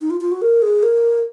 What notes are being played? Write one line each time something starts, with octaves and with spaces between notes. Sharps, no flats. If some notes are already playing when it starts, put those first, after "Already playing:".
D#4
F4
F4
F#4
A#4
G#4
A#4